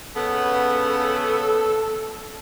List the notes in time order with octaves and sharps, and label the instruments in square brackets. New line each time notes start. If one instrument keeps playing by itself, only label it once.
[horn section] C#3 B3 [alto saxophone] A4